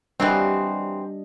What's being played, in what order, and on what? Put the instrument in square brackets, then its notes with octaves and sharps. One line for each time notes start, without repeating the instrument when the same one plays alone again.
[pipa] E3 F#3 C4 [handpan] G3 D4 D#5